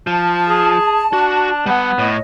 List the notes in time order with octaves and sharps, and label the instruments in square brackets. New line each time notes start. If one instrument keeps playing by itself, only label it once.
[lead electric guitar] F3 [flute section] A5
[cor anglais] G#4
[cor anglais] D4 [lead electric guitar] F#4
[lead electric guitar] G3 F#5 [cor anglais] B3
[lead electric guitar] A2 [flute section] D#5